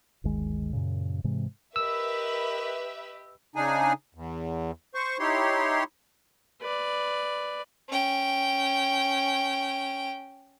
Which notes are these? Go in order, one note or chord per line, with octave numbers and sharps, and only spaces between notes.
G1 D2 D#3 G#3
F#2 A#2 C#3
G#2 C3 E3 G#3
G4 A#4 B4 D#5 E5 E6
C#3 D4 D#4 G#4 G#5
E2
C5 C#6
D#4 E4 G4 C#5 C6
B4 D5
C#4 G5